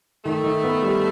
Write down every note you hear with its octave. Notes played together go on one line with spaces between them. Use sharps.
D#3 A3
D#3
B3
G3